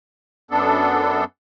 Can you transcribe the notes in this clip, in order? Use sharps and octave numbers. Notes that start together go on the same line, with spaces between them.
F#2 B3 D4 A4